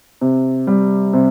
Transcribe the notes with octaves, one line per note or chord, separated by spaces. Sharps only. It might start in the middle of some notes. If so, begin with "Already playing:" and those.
C3
G3
C3